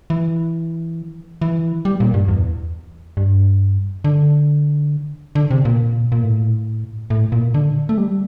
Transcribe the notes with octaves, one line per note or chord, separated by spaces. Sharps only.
E3
E3
G3
A#2
G2
E2
G2
D3
D3
C3
A#2
A#2
A2
A2
A#2
D3
A3
G3